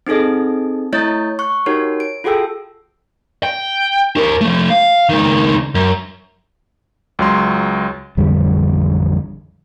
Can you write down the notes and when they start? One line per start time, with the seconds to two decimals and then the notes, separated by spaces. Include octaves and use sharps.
0.07 C4 D#4 G#4 A4 D#5
0.93 A3 E4 C#5 D#5 G6 A6
1.39 C#6 F#6
1.66 D#4 F#4 G4 A#4 C#5
2.00 D7
2.24 F4 F#4 G#4 A4 G5 E6
3.43 G5
4.17 G4 A#4
4.41 F3 A3
4.70 F5
5.09 C#2 D#3
5.75 F#2
7.19 C#2 F#3 C6
8.17 A1 F2 D3 G3